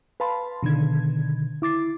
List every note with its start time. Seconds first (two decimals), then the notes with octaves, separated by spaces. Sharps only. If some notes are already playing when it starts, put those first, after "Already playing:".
0.20 B4 F5 A5 B5 C6
0.63 B2 D3 D#3 G#6
1.62 E4 D6 A6 C7